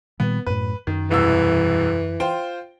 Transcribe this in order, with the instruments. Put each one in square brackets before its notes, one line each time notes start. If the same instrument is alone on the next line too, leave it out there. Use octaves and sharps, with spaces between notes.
[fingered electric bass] A#2 D#3 G3 [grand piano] B3
[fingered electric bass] F#2 A2 [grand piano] B4
[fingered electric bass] F#2 [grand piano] D#3
[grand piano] E1 C2 E6 [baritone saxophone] E3
[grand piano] F4 C5 G5